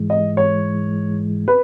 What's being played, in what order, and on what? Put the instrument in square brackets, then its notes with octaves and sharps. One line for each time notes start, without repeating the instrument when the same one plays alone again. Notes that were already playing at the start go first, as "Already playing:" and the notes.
Already playing: [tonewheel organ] G#2 E3 G#3
[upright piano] D#5
C#5
B4